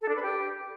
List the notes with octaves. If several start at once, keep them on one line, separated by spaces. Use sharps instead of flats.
A4
D4
B4
G4